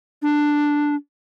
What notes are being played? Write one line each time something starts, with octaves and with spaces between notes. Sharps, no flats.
D4